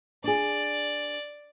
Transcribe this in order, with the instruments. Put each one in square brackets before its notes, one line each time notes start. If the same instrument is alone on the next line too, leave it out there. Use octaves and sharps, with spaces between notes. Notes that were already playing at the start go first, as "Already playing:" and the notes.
[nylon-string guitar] D4 G#4 [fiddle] D5